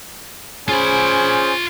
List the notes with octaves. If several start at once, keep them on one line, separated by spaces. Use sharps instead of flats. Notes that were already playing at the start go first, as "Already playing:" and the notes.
C#4 F4 G#4 C5 B5